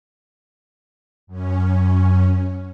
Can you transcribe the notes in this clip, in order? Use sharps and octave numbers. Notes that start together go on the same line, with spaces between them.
F#2 C#4